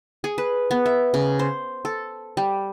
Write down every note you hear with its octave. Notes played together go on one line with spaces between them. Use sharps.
G#4
B4
B3
E5
C#3
C5
A4
G3